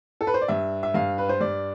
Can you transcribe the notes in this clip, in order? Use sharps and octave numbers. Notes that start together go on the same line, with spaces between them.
A4
B4
C5
D5
G2 E5
E5
G2 F5
B4
C5
G2 D5